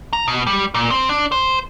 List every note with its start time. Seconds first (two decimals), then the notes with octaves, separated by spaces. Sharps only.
0.13 A#5
0.28 B2
0.47 G3
0.74 A#2
0.91 C4
1.09 D4
1.32 C5